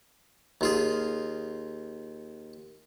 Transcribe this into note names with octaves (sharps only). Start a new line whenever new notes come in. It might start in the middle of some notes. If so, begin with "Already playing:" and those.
D#2 F4 G#4